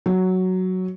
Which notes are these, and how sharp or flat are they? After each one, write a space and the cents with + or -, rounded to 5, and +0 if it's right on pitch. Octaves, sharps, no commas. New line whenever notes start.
F#3 +5